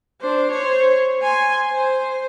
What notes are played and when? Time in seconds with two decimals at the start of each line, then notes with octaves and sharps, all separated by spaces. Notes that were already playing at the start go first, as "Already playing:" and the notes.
0.21 D4 C5
0.51 C5 C#5
1.23 G#5 C6
1.72 C5